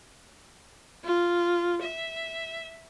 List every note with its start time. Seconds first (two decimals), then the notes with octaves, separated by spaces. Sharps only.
1.04 F4
1.82 E5